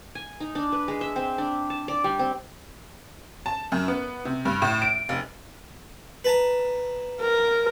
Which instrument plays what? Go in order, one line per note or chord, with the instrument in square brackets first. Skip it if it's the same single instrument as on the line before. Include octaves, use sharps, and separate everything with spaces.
[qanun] G#5
D#4
D4
B4
G#3
E5
C4
D4
A5
D5
G3
C4
[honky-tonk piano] A5
F#2
B3
C3
G2
A2
D7
F1
[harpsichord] B4 A5 A#5
[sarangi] A#4